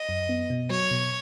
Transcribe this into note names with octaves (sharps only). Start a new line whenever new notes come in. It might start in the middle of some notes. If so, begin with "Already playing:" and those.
Already playing: D#5
F#2
B3
B2
F#3 C#5
B2